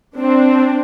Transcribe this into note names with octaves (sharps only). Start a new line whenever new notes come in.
C4 D4